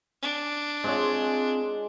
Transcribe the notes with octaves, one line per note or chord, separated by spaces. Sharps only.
D4
G#3 C4 F4 C#5